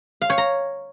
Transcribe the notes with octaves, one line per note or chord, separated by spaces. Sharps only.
F5
C#5
A#5